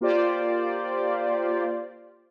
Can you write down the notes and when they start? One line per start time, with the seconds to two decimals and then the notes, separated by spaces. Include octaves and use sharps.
0.01 A#3 F4 G4 C5 D5